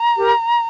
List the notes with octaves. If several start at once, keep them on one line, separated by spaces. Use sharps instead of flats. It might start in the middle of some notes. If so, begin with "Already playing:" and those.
Already playing: A#5
G4 A#4